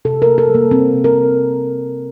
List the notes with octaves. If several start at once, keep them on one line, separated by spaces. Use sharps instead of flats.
C3 A4
A#3 A#4
A4
G3
A#3
C3 C4
C3
A#4